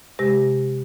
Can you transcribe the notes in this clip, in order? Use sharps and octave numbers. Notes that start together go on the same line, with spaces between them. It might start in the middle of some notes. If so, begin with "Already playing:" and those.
C3 G#3 G4 A#6